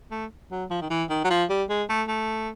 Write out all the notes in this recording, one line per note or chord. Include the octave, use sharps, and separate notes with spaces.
A3
F#3
F3
D#3
E3
D#3
F#3
F3
G3
G#3
A3
A3